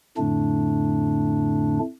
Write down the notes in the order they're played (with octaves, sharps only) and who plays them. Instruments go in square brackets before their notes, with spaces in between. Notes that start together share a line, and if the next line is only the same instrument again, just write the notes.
[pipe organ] F2 A2 D3 A3 D4